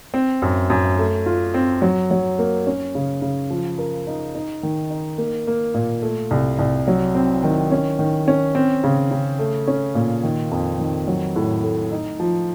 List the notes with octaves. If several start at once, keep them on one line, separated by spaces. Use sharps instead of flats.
C4
F#2
F#2
A3
F4
C4
F#3
F#3
A#3
C#4
C#3
C#3
F3
A#4
D#4
D#4
D#3
D#4
A#3
A#3
A#2
A3
C2
C2
F#3
C4
D#3
C#4
D#3
C#4
C4
C#3
C#3
A3
C#4
A#2
D#3
F2
D#3
F#3
A2
A3
D#4
F3